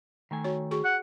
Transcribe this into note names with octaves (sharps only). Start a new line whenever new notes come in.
D#3 A3 G#5
F#4 C#5
F#4 G#4 C#6
F#5